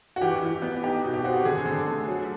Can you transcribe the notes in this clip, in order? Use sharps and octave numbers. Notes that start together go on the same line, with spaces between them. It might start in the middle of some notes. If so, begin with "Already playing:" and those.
F#4
E3 G4
E3
B3
D#4 G4
B2
G4
C4 F#4
G4
D3 G#4
D3 A4
A3 A4
F#3